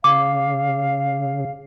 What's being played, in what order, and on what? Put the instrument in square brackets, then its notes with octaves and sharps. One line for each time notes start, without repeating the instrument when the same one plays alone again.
[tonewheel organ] C#3 [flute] F5 [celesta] D6